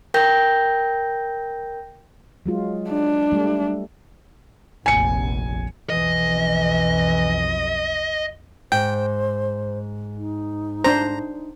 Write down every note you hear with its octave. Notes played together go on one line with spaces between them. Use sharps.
A#4 G5 G6 A#6
F#3 G#3 F4
D4
G3 A3
F1 A#1 G#5 C#7
B1 F2 E3 D#5
G#2 C5 G5
D#4
D4 C5 A#5